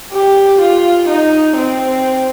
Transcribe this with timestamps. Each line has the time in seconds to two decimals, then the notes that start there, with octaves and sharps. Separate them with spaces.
0.13 G4
0.61 F4
1.09 D#4
1.57 C4